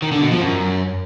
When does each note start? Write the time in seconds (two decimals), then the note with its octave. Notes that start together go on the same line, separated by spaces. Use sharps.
0.02 D#3
0.12 D3
0.21 B2
0.31 F3
0.40 F#2